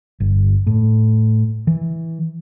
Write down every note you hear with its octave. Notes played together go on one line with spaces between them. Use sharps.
G1
A2
E3